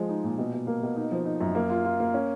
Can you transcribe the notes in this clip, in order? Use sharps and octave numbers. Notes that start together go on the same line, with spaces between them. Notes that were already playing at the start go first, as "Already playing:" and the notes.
Already playing: F3 G#3
D#4
A#2
B2
B2
A#3
B2
D#4
F3
D#4
F#2
A#3
F4
F4
A#3
C#4